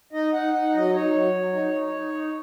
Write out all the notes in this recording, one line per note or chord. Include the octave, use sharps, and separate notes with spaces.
D#4 D#5
D#4 F#5
D#4 F#5
F#3 D#5
D#4 C#5
F#3
F#3
D#4
D#4
D#4
D#4